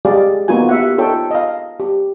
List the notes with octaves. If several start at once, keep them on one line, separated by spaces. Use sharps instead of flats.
G#3 G4 G#4 D5 F5
A#3 B3 D#4 F4 F#4 G#5
G4 E5 F#5
D#4 F4 A4 C#5 G5
D#5 F5
G4